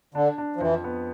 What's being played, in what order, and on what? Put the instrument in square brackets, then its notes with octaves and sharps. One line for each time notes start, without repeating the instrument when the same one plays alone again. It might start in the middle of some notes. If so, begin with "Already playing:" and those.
[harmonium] D3 [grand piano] D4
[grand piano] D4
[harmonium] F3
[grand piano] F2 [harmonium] E3
[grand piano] B3